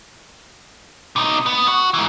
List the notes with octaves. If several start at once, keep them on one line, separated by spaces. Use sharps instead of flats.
C3 D#4
B3
F#4
G#2 E3